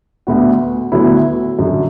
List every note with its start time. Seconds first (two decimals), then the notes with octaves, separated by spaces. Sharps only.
0.27 D2 D3 B3 F#4
0.92 D2 D3 F#3 B3 E4
1.59 F#2 D3 F#3